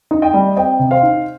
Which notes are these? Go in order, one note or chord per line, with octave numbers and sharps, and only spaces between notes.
D#4
D#5 G5
G3
C4 D#5 G5
C3
C5 F5
D#4